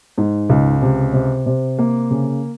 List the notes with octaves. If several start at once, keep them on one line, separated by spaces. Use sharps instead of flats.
G#2
C#2
C3
C3
C3
A#3
C#3